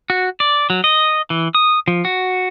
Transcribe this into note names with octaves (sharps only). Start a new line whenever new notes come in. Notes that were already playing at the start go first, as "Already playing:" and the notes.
F#4
D5
F#3
D#5
E3
D#6
F3
F#4